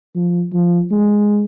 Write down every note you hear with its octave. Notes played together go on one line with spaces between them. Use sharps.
F3
F3
G#3